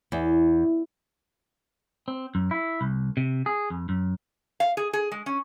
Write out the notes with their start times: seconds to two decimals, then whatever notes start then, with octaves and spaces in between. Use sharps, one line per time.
0.12 E2
2.08 C4
2.35 F#2
2.51 E4
2.81 C2
3.17 C3
3.46 G#4
3.70 F2
3.89 F#2
4.60 F5
4.77 G#4
4.93 G#4
5.12 G#3
5.26 C#4